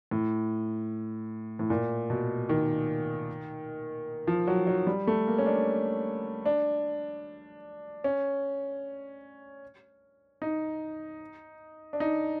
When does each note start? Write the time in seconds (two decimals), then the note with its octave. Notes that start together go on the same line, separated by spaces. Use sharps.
0.11 A2
1.59 A2
1.70 A#2
2.10 B2
2.49 D#3
4.27 F3
4.48 F#3
4.67 F#3
4.87 G3
5.07 A3
5.27 A#3
5.39 C#4
5.46 D4
6.46 D4
8.04 C#4
10.42 D#4
11.93 D4
12.00 D#4